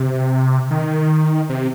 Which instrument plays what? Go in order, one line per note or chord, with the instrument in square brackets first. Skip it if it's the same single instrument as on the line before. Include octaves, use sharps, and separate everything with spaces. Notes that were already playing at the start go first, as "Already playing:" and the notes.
Already playing: [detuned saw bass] C3
D#3
C3